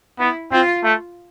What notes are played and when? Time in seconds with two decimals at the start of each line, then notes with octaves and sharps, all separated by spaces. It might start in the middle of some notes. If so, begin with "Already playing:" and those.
0.19 B3 E4
0.51 C4 F4
0.84 A3